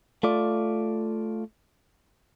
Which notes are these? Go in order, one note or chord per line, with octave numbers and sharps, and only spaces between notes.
A3 F4 D5